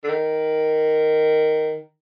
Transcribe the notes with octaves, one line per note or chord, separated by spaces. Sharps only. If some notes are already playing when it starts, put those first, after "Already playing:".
D3
D#3